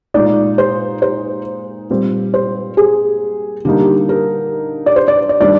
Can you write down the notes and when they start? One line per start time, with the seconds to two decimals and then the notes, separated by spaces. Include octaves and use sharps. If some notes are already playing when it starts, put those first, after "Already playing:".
0.14 A#2 G#3 D#4 D5
0.58 C5
1.02 C5
1.90 A#2 G3 C4
2.34 C5
2.77 G#4
3.65 D3 G3 A#3 D#4 G4
3.80 G4
4.09 A#4
4.86 D5
4.96 C5
5.08 D5
5.29 D5
5.40 D#3 G3 D4 G4 D5